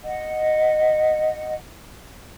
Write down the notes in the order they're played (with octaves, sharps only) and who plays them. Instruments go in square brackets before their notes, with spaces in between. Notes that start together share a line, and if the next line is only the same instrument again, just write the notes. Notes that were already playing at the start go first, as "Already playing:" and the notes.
[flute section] D#5 F#5